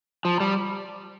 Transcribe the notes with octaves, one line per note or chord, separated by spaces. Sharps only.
F3
G3